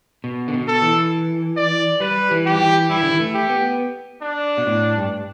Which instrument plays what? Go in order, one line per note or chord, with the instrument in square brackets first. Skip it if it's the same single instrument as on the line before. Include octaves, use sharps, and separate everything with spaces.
[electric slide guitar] B2
D3
B2
[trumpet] A4
[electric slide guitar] E3
[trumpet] D5
[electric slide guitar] G3 [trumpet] B4
[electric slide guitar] E3
[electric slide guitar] G3 [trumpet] G4
[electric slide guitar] E3
[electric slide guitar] G3 [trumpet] E4
[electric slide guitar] E3
D3
E3
A3
[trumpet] G4
[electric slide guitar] B3
[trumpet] D4
[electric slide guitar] B2
A2
G2